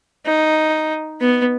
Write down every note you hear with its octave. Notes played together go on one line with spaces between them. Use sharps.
D#4
B3